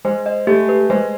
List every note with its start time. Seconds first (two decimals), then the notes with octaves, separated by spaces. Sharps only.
0.05 G#3 C5
0.26 D#5
0.47 A3 G4
0.69 B4
0.90 G#3 C5